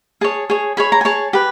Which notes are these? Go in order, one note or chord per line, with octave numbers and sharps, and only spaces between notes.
G#4 C#5 A5
G#4 C#5
G#4 C#5 B5
A#5
G#5
G#4 C#5 A5
G4 B4